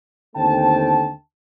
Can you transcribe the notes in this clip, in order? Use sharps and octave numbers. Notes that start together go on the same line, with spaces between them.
D#2 D3 A3 C4 G5 A5